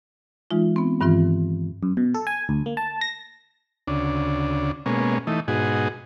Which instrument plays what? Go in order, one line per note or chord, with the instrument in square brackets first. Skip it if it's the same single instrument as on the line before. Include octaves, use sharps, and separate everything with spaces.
[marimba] E3 G#3 D#4 F4
B3 C4
G2 D#3 E3 C4 F4
[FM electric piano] F#2
B2
A4
G#5
D2
A#3
A5
A#6
[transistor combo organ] D2 C#3 D4
B2 G#3 A#3 C#4
E3 A3 D#4
G#2 B2 D#4 F#4 G#4